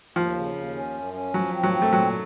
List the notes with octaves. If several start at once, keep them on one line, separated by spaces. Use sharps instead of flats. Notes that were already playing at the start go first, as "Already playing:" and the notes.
D#2 F3
C#3
D#2
C#4
F#2
C#4
F3 F#3
C4
F#3
C4
A3
A#2 F#3